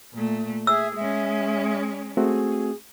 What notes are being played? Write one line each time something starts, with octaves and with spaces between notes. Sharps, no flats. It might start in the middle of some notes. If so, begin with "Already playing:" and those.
A#2 A3
G#4 E5 E6
G#3 C#4 E5
A3 C4 F#4 G#4